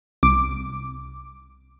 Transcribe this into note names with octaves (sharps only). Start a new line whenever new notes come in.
C2 D6